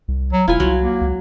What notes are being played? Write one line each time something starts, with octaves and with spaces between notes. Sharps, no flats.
C2
F#3
E1 E4 F4 G#5
C2 F#3
A#3
C#2